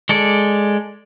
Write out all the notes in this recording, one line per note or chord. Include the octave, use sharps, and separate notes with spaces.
G#3 A4 D5